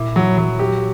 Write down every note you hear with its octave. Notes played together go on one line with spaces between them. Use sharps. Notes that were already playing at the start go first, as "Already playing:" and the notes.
Already playing: A#2 E4
F#3
F#3
G4